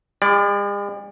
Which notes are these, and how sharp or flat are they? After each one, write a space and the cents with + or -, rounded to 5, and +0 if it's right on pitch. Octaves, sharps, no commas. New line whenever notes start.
G#3 -45 D5 +0